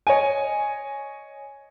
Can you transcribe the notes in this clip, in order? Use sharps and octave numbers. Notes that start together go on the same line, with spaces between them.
C#5 D#5 G#5